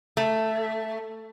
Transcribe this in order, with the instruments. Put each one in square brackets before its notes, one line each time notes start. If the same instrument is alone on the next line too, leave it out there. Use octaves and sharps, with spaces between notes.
[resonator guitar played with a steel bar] A3